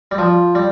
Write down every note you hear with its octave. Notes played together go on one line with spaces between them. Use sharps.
G3
F3
G3